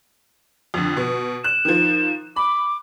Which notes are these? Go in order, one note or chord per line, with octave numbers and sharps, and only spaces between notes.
F2 D3
B2
F#6 E7
D#3 F3
B5 D6